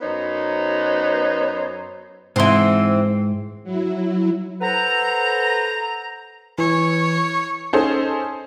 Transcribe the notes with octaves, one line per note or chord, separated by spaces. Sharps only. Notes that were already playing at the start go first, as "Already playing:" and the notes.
F#2 B3 D#4 C5 C#5
G#2 E3 C4 C6
F#3 E4
A4 B4 C5 F#5 A#5
E3 C#5
C#4 D#4 G#4 A4 C5